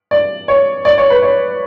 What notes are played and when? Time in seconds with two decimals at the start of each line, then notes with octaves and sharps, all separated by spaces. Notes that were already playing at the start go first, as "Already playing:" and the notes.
0.11 D5
0.48 C#5
0.85 D5
0.98 C#5
1.10 B4
1.22 C#5